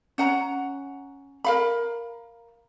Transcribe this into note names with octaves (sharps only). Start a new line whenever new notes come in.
C#4 F#5 A#5
A#4 F5 B5